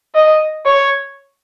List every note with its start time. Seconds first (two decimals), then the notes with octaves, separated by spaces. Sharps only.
0.15 D#5
0.66 C#5